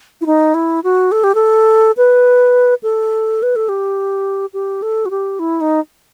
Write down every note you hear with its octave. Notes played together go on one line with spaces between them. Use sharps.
E4
D#4
E4
F#4
A4
G4
A4
B4
A4
B4
A4
G4
G4
A4
F#4
G4
E4
D#4